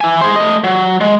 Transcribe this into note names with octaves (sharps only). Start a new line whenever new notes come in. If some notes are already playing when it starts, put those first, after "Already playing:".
E4 G#5
G#4 C5
A3 D#5
F#3
G#3